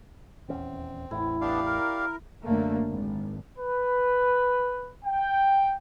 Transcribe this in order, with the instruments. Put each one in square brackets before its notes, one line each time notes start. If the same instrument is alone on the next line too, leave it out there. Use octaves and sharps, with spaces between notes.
[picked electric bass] D#1 E2 C#4 [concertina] C4
[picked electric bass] A1 E2 A2 [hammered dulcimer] E4
[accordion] B3 D4 [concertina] G4 D5 F5
[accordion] A#4
[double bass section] F#2 D3 A3 A#3
G#1
[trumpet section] B4
G5